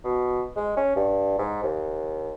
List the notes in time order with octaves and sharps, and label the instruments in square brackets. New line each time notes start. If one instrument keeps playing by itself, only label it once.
[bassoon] B2
G#3
C#4
G2
G#2
D#2